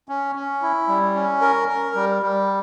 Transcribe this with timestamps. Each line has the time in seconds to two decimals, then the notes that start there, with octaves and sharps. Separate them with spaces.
0.09 C#4
0.35 C#4
0.62 E4
0.88 G3
1.15 C#4
1.41 A#4
1.68 A#4
1.95 G3
2.23 G3